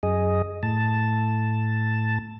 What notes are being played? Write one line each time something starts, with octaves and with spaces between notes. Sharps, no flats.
F#2 G#4 D#5
A2 A5